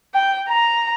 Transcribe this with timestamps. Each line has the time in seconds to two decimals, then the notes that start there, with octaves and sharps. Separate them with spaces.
0.15 G5
0.49 A#5